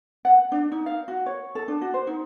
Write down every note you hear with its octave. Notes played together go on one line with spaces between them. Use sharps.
F#5
D4
D#4
F5
F#4
C#5
A4
D4
F#4
C5
D#4